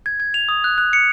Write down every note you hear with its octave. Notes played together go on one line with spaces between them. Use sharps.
G#6
G#6
F7
D#6
F#6
F#6
C#7